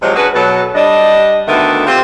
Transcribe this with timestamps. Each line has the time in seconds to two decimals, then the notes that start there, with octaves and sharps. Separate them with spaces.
0.02 C3 F3 F#3 G#3
0.16 C#4 D4 F#4 G#4 B4
0.34 B2 F#3 A4
0.74 G3 D4 D#5
1.48 D2 D3 D#3 B3 A4 E5
1.86 C4 F4 G4